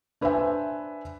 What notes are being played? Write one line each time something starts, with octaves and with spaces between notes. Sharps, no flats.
D4 B4 C5 D5 E5 G#5